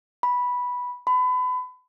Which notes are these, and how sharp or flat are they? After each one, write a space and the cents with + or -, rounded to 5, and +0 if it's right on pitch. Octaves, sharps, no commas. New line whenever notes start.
B5 -5
B5 +30